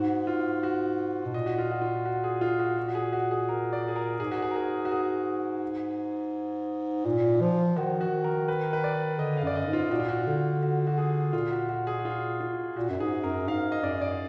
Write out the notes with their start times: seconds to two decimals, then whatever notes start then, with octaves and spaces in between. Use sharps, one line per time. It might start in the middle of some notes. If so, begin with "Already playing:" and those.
Already playing: G#2 F#4
0.27 F4
0.63 F#4
1.26 B2
1.34 A#2 D#5
1.46 F#4
1.59 F4
1.71 F#4
1.82 F4
2.05 F#4
2.24 G#4
2.41 F4
2.59 F#4
2.77 F#4
2.88 F#4
2.95 G#4
3.13 F#4
3.31 G#4
3.49 A#4
3.73 D5
3.88 G#4
3.96 A#4
4.20 G#2 G#4
4.31 F#4
4.42 G#4
4.51 A#4
4.56 G#4
4.85 F#4
4.91 G#4
7.06 A#2
7.42 F3
7.77 D#3 F#4
8.01 F#4
8.24 A#4
8.48 B4
8.63 A#4
8.73 B4
8.84 D5
9.19 D3 D#5
9.37 F5
9.43 F#2 D5
9.55 D#5
9.67 G#2
9.73 F4
9.91 A#2 F#4
10.00 F4
10.08 F#4
10.27 D3
10.62 F#4
10.87 F#4
10.98 G#4
11.33 A#2 F4
11.51 F#4
11.69 F#4
11.87 G#4
11.99 F#4
12.05 F4
12.41 F4
12.76 A#2 F#4
12.90 F#2
13.00 G#2 G#4
13.23 F#2 A#4
13.48 G#2 F5
13.72 D#5
13.83 F#2 D5
14.01 D5